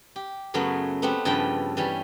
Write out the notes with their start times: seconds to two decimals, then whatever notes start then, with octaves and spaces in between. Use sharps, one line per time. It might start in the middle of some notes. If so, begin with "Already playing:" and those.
0.16 G4
0.54 F#2 C#3 F#3 A3 B3 C#4
1.02 A3 B3 C4 G4 F#5
1.25 G2 C#3 F3 A4 B4 G5
1.77 E3 G3 C#4